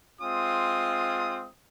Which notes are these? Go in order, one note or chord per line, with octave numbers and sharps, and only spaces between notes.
G#3 C4 F4 D#6